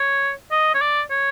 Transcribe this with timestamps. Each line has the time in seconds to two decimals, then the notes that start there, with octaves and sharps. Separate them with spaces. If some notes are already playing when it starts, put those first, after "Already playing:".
Already playing: C#5
0.52 D#5
0.75 C#5
0.82 D5
1.11 C#5